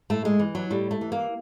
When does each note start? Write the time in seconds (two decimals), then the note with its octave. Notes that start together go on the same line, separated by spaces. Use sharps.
0.10 A2 A3
0.25 G#3
0.39 E3
0.55 F#3
0.70 A2 G3
0.91 A3
1.01 E3
1.12 A#3